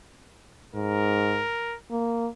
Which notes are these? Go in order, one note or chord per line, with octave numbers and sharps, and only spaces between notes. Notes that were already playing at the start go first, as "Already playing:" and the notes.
G#2 A#4
A#3